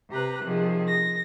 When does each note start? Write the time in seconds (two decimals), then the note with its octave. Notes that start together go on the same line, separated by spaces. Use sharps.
0.11 C3 G4 B4 A#5 F#6
0.44 C3 D#3 F3 G#4
0.87 A#6